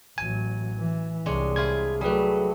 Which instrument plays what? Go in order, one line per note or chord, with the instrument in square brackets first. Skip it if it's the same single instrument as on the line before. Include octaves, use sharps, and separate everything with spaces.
[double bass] A1 F#3 [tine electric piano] G#5
[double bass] E3
[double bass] C2 [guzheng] G#3 D4 C#5
[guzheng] E4 F4 G#4 [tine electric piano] G#6
[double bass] F#3 [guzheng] G3 A3 [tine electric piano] G#4 B4